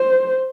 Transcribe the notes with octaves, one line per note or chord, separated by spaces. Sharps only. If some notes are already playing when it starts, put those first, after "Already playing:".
Already playing: C5